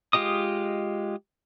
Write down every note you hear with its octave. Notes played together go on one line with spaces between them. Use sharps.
G#3 F4 G4 D#5 D#6